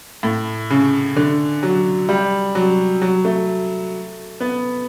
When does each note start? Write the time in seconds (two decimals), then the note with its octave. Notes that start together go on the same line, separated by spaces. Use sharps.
0.23 A2
0.70 C#3
1.16 D3
1.63 F#3
2.09 G3
2.55 F#3
3.02 F#3
3.25 A3
4.40 B3